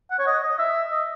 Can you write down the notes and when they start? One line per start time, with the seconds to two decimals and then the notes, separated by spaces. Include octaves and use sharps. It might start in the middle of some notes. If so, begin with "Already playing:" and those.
0.11 F#5
0.19 C#5
0.27 D#5
0.43 D#5
0.59 E5
0.92 D#5